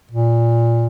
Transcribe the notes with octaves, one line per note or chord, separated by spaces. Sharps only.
A#2